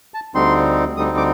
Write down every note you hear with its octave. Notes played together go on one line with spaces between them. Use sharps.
A5
D2 D3 G3 C4 D#4 C6
D2 D3 G3 C4 D#4 D#6
D6